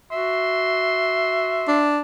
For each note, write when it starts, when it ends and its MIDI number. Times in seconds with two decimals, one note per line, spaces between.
0.12 1.80 66
0.12 1.95 76
0.12 1.85 84
1.68 2.01 62